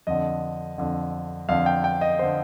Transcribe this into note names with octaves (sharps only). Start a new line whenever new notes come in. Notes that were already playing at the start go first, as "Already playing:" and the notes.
F2 D3 D#5
F2 D3
F2 D3 F5
G5
G5
D#5
D3 C5